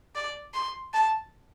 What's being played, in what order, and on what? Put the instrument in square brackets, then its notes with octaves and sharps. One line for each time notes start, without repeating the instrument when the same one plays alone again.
[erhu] D5
C6
A5